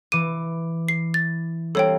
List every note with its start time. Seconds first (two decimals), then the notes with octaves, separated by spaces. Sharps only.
0.12 E3 D6 D#7
0.88 C7
1.14 A6
1.75 G3 A#3 C4 A4 C#5 G5